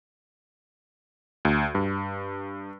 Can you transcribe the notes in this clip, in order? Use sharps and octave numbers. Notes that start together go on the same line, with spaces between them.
D2
G2